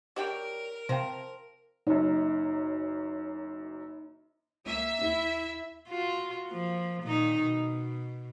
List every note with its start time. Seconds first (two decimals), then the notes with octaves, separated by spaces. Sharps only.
0.16 F#3 D4 G4 A#4 D#5 G5 D6
0.89 C3 F3 C5 F5 G5 A#5
1.87 F#1 F#2 D#4
4.66 C#2 A#3 E5
5.01 D#2 E4
5.89 F4 F#4
6.48 F3 A#3
7.03 A#2 D#3 D#4
7.41 B2